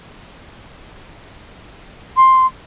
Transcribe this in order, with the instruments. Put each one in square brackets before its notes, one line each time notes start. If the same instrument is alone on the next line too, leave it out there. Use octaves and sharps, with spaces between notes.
[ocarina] C6